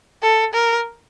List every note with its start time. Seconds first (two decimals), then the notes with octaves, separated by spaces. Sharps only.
0.22 A4
0.54 A#4